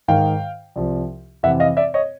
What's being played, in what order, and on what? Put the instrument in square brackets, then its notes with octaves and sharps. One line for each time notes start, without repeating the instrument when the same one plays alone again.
[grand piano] G#2 D#3 F5 G5
C2 C3 F3
F2 C3 E3 E5 F#5
D#5 F5
D5 E5
C#5 D#5